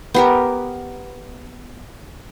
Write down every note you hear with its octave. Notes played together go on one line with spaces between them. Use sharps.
B3 G4 A#4